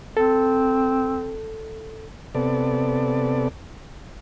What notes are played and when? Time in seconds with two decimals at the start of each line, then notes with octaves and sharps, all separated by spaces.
0.17 C4 A4
2.35 C3 B3 A4 D5